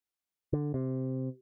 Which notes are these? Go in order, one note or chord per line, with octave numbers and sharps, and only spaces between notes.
D3
C3